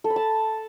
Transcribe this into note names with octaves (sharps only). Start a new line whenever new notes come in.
A4
B5
A5